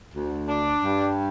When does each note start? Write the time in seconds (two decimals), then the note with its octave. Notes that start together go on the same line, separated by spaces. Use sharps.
0.14 D2
0.49 D4
0.83 G2